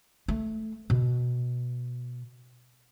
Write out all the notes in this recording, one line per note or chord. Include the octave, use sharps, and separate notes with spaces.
A3
B2